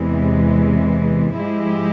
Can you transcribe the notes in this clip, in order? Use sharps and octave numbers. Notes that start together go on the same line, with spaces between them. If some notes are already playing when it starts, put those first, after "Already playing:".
Already playing: E2 C3 E3 G#3
G#2 F3 G#3 E4 G4